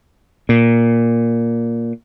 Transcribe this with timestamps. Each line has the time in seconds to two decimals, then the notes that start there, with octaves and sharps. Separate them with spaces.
0.49 A#2